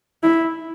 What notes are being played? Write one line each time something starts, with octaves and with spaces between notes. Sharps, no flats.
E4